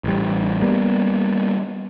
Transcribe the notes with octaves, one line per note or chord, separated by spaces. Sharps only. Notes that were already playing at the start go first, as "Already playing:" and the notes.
A1 G3
G3 A#3 B3